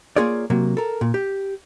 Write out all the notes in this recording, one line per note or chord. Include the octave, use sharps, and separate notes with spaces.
A#3 F4 G#4 C#5 D5
C3 F#3 A#3
A4 A#4
A#2
G4